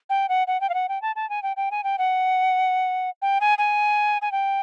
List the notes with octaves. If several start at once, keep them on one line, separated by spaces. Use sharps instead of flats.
G5
F#5
F#5
G5
F5
F#5
G5
A5
A5
G#5
G5
G5
G#5
G5
F#5
G5
G#5
G#5
G#5
G5